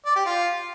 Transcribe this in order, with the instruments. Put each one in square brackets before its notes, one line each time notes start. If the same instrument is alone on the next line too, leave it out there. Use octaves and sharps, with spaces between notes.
[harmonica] D5
G4
F4